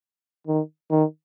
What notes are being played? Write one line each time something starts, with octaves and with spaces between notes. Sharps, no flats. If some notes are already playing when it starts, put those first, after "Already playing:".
D#3
D#3